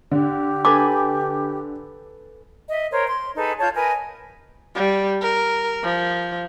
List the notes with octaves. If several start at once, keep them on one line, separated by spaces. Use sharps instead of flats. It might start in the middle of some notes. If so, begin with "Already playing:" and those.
D3 G4
A4 B4 G#5 D6
D#5 E5
A#4 C5 C#5
C6
D#4 G#4 A4 B4
F4 C#5 A5 G6
A#4 B4 D#5 G#5
G3
A#4
F3